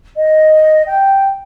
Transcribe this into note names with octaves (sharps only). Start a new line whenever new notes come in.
D#5
G5